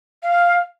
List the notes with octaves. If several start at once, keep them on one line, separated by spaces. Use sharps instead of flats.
F5